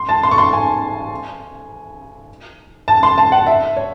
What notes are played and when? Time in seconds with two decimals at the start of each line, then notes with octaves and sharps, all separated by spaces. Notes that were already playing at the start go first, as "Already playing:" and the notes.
Already playing: C6
0.09 A5
0.23 C6
0.31 C#6
0.38 C6
0.53 G#5
2.88 A5
3.03 C6
3.18 A5
3.32 F#5
3.47 E5
3.77 C#5